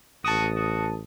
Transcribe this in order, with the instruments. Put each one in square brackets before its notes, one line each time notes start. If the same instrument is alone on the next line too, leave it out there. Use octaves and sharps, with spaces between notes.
[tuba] A1 [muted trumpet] F#4 [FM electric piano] A5 D#6
[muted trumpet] F#4